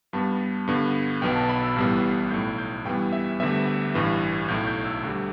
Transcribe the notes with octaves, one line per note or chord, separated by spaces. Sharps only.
G2 G3 B3 A5
G2 D3 B3
B1 B2 B3 G5
A5
B5
E6
A1 A2 G3 B3
B1 A2 A3 G6
G6
G2 E3 G3 B3 G5
E5
D2 D3 G3 B3 E5
A1 G2 E3
B1 A2 A3 G6
G6
E6
D2 D3 G3